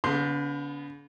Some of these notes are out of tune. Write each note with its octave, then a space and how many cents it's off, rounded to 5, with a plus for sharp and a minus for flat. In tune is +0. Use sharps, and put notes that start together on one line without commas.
D3 -45 B3 +0 C6 +0